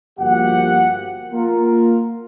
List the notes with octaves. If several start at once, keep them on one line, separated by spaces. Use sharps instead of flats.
G1 F3 A#3 F#4 G4 F#5
A#3 F4 A#4